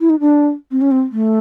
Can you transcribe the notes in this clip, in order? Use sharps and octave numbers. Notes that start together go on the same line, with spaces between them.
E4
D#4
D4
C4
C#4
C4
A3